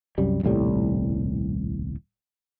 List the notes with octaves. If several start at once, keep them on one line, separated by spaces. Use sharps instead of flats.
C2 F#2 G3
D#1 C2 A2 G3